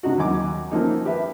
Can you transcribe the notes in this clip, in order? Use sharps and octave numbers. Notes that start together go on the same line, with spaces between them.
C3 D4 D#4 F#4
D#2 F#3 G#5 D6
D#3 F3 A3 A#3 C#4 D#4
G4 B4 E5